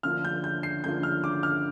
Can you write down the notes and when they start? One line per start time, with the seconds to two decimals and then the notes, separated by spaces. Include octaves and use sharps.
0.03 D2 D3 F3 A#3 F4 F6
0.24 G6
0.44 G6
0.63 C7
0.84 D2 D3 F3 A#3 F4 G6
1.03 F6
1.24 D6
1.43 F6